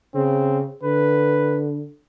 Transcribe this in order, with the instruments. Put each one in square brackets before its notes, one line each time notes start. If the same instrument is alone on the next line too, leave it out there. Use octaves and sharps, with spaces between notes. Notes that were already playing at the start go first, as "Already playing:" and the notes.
[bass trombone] C#3 [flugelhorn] C4
[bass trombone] D3 [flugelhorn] B4